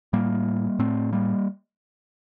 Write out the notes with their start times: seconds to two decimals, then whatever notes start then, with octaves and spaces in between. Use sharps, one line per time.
0.13 A2 G3 A#3
0.79 A2 A3 C4
1.12 G3 A#3